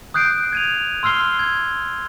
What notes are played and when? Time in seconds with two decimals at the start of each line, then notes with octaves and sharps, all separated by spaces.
0.14 D#6 F#6 G6 C7 D7
0.52 G#6 D#7 F7
1.03 C6 E6 F6 C7 G7
1.39 G#6